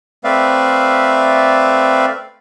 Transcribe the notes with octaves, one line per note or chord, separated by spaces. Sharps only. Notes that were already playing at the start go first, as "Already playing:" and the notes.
A3 C4 B4 D5 E5 F5